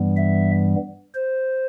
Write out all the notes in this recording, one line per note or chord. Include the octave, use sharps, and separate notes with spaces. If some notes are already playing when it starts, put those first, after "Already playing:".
Already playing: G2 E3 G3 B3
E5
C5